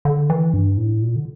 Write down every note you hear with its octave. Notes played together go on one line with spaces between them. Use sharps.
D3
E3
G2
A2
A#2
D3